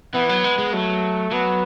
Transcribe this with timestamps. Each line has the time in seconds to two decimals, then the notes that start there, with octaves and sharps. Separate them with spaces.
0.14 E3 B3
0.29 F#3
0.44 G#3
0.58 G#3
0.73 F#3 A3
1.31 F#3 B3